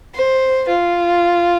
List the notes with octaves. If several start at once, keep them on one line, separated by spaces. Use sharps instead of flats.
C5
F4